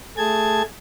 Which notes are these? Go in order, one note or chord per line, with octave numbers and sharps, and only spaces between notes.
A3 G#4 A5 G#6